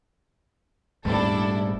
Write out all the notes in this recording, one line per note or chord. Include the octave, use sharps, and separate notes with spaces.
D#1 G#2 G3 A3 D4 E4 A4